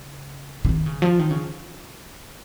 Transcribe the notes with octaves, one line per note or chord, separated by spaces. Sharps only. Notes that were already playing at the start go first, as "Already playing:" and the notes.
Already playing: C#3
C#3
D#3
C#3
F3
D#3
C#3